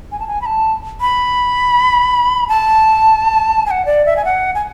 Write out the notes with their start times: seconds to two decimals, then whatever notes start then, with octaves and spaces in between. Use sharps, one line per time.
0.12 G#5
0.20 A5
0.27 G#5
0.42 B5
0.46 A5
1.01 B5
2.48 A5
3.66 G#5
3.71 F#5
3.86 D5
4.06 E5
4.17 G#5
4.25 F#5
4.55 G#5